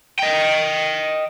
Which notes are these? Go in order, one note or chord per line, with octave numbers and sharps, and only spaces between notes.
D#5 G5